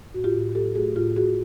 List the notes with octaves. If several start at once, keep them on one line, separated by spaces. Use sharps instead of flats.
A2 F#4
F4 G4
A2
F#3 G4 A4
A3 F#4 G#4
A2 F4 G4
A2 F#4 G#4